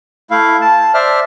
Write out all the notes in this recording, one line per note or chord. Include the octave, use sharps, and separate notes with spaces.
A3 E4 F5
A5
C5 D5 E5 F6